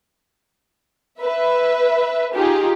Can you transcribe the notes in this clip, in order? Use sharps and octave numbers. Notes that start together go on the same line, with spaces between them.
B4 E5
D#4 F4 G4 G#4